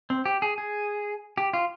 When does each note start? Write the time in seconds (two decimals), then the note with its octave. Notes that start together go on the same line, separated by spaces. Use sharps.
0.10 C4
0.26 G4
0.42 G#4
0.58 G#4
1.38 G4
1.53 F4